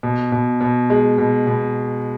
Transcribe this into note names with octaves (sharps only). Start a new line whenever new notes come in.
B2
B2
B2
G#3
B2
B2